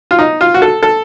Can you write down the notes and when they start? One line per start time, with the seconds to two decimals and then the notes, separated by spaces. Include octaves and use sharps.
0.11 F4
0.19 D#4
0.41 F4
0.54 F#4
0.62 A4
0.83 A4